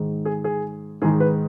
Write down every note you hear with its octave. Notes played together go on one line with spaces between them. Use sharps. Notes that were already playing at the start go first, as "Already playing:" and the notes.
Already playing: G#2 D#3
G#4
G#4
G#2 D#3 G#4
B4